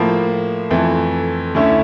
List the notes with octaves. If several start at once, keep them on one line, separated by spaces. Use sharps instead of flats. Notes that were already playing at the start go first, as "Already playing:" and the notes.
Already playing: A2 F3 A#3
F2 E3 A3
D2 D3 A3 C#4 E4